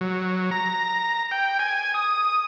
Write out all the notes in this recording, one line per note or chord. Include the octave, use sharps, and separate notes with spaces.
F#3
A#5
G5
G#5
D#6